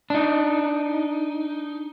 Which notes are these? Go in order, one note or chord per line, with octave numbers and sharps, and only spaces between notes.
D4 D#4